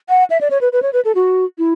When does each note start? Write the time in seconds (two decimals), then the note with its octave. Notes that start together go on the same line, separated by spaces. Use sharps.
0.09 F#5
0.30 E5
0.41 D5
0.51 C#5
0.61 B4
0.73 B4
0.82 C#5
0.93 B4
1.05 A4
1.15 F#4
1.58 E4